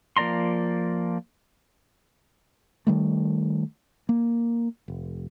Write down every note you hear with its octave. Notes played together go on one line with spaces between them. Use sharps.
F3 A#3 D5 A#5 C6
D#3 G3 A3
A#3
F1